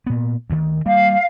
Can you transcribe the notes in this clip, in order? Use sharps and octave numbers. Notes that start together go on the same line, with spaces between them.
A#2 B3
D2 D#3
G3 A#3 F5